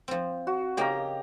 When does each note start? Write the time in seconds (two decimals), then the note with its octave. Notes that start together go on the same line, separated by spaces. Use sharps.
0.08 F3 C4
0.47 F#4
0.77 C#3 A#3 D#4 G4 A#5